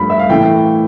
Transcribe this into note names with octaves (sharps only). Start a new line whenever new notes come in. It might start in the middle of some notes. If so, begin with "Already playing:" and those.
Already playing: G2 F3 A3 B5
E5
F5
A2 E3 A3 G5